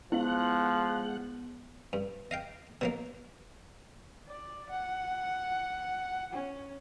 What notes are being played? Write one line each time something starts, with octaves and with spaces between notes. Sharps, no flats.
F3 G#3 B3 E4 F5 F#5 F#6
G2
D#5 F5 G5
B2 F#3 A#3
D5
F#5
C#4